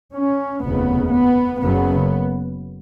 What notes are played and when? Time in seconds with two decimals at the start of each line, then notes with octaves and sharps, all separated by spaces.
0.15 C#4
0.64 F1 D#2 C#3 B3
1.12 B3
1.61 F#1 F#2 C#3 B3